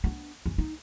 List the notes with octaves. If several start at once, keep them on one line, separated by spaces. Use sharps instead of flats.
B3 D4
F#2 C#4
D#4